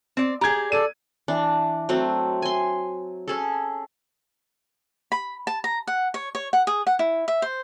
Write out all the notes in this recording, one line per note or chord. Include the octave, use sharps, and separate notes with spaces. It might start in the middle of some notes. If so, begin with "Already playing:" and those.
C4 D5
G4 G#4 A#5 G#6
A4 D5 D#7
E3 D4
F#3 A3 C4
G#5 C6
C#4 G#4 A4
B5
A5
A#5
F#5
C#5
C#5
F#5
G#4
F#5
E4
E5
C5